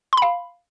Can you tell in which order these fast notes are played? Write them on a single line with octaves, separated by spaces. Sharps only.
C6 B5 F5